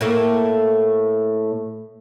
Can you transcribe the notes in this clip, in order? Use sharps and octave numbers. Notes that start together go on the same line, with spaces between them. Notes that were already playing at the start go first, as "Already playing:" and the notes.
A2 A3 A#3